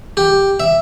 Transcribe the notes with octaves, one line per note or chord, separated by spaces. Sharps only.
G4
E5